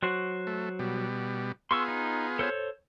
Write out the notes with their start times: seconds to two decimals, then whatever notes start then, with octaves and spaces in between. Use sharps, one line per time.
0.03 F#3 F#4 C5
0.47 A3
0.79 B2 G3
1.71 B3 F4 G#4 C6 C#6 E6
1.88 D#4
2.39 A4 C5 C#5